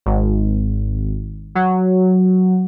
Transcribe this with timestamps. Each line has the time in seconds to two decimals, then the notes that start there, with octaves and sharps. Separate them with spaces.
0.06 G#1
1.55 F#3